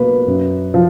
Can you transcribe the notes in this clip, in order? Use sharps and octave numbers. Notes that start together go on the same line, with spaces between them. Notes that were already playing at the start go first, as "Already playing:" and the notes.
Already playing: B2 A#3 B4
F#2
F3